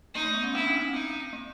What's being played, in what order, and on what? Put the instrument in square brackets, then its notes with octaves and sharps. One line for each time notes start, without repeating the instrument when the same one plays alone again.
[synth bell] A#3 [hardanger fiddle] D#4
[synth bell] A3
B3
C#4
[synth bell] C4 D4 [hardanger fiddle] E4
[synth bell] C#4 D#4
C#4
[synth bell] C4 [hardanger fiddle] D#4
[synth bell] A#3